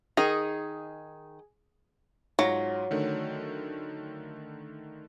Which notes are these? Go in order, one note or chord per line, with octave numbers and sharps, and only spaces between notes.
D#3 D#4 G#4 A#5
G#2 F#3 F4 A#6
D3 D#3 A3